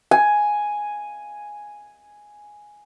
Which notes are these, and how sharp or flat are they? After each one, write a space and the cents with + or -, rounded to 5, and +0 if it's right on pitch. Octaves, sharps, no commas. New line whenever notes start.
G#5 +0